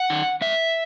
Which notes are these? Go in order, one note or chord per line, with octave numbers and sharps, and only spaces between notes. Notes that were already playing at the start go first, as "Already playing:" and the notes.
Already playing: F#5
D#3
G#2 E5